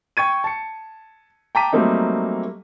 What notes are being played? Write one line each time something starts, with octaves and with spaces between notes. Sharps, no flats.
G5 C#6 G#6 D#7
A5 C#7
G5 A5 A#5 D6 B6 D#7
F#3 G3 A3 A#3 C4 D#4